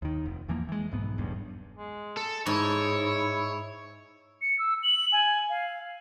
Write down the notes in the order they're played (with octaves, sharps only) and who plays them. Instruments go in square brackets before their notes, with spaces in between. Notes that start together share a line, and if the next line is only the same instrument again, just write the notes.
[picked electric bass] D#2 D#3
F1
E2 E3 F3 A#3
E3 G#3
B1 G#2 B3
E1 B1 E2 G2
[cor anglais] G#3
[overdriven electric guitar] A4
[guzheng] G#2 [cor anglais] E4 [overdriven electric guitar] C#5
[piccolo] C#7
E6
F#7
G#5
F5